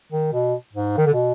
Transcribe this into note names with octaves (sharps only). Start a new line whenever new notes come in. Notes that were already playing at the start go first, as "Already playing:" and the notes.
D#3
B2
G#2
D#3
D3
B2